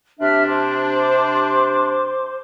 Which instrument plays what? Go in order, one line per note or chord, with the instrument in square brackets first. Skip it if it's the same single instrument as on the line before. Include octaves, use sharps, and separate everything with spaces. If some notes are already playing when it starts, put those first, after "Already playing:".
[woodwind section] C3 D4 [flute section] G4 E5 F6
[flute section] C5 C6 D6